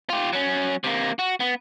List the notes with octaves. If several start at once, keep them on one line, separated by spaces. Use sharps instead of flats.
F4 G4
F#3 C#4
C3 A#3
F#4
B3